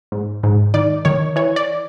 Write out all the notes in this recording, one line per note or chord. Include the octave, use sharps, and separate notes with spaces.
G#2
G#2
D#3 D5
D#3 C#5
E3 C#5
D5